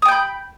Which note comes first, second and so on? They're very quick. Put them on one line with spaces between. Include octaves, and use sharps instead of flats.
D#6 G5 G6 B5